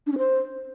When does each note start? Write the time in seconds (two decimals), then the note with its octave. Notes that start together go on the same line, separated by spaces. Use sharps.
0.07 D4
0.12 C#4
0.18 C5